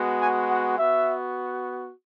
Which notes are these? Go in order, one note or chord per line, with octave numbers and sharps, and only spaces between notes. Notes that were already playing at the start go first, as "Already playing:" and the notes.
Already playing: G#3 B3 F#4
G#5
F#5
B3 F#4 E5